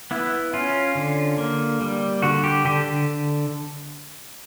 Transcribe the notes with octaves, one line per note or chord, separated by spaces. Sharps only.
B3 E4
C#4 F4
D3
A#3
G3
D3 F#4
G4
D3 G4